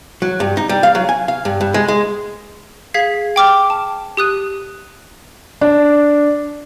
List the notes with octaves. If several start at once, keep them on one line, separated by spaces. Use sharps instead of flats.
F#3
G2
D#4
G3
F5
F#3
G#5
F5
G2
G2
G#3
G#3
G#4 F5 G#6 B6 C7
G5 D6 F6
A5
G4 D#6 F#6 D#7
D4